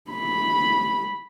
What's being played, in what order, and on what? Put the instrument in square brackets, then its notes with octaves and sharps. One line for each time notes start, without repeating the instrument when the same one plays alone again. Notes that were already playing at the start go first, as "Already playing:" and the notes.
[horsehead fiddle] B5